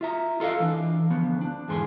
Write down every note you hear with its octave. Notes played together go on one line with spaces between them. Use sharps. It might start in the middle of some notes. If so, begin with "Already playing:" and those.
F4 E5 A#5
F4 A4 D#5 F5
E3 D4
D2 F3 B3
D4
E2 G#2 D3 G#4 C6